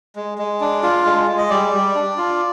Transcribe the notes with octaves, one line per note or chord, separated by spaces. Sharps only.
G#3
G#3
D4
F4
G#3
G#3
D#5
G3 D5
G3
D4
F4